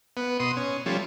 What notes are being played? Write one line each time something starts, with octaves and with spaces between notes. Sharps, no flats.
B3
B2 C6 D#6
C#4
F3 G3 A3 C#4